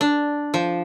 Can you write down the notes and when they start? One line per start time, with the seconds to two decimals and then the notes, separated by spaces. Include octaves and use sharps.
0.01 D4
0.54 F3